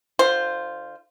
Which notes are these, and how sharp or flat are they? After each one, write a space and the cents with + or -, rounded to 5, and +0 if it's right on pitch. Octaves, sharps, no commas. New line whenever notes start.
D3 +40 F4 -5 C5 +0